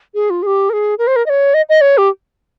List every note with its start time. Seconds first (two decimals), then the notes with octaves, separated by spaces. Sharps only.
0.14 G#4
0.30 F4
0.42 G#4
0.47 G4
0.70 A#4
0.73 G#4
0.98 A#4
1.07 C5
1.16 A#4
1.26 D#5
1.29 C#5
1.54 D#5
1.69 D#5
1.81 C#5
1.98 G4